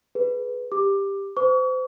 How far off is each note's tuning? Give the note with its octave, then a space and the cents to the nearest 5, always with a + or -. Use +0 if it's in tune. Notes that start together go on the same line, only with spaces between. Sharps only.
G#4 +20 B4 +0
G4 +10 D6 +10
C5 -30 C#6 +40